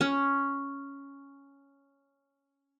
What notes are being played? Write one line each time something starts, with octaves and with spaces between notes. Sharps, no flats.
C#4